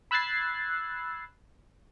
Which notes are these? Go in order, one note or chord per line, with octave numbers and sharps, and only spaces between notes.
B5 E6 F#6 G#6 A6 C7